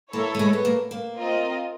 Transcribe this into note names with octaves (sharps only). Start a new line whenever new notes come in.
A#3 E4 A4 C#5
A3
G#3
B3
A#3
A#3
C4 F4 A#4 D#5